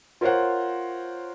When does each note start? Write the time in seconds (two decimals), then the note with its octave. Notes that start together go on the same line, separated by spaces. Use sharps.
0.21 F4 A#4 C5 C#5 F#5